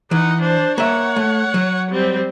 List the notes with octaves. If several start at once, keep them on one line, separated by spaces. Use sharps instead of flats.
E3 D#4 F#5
D4 C5
A#3 C#5 E5 F#5
A3
F#3
G3 C4